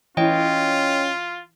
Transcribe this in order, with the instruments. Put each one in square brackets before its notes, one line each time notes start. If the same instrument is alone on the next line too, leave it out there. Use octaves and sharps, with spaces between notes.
[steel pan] E3 E4 [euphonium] C#4 [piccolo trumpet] F4 [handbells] C#5 D#5 G5